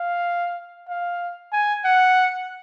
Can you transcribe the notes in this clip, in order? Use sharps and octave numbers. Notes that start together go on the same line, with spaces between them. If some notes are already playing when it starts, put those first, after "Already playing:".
Already playing: F5
F5
G#5
F#5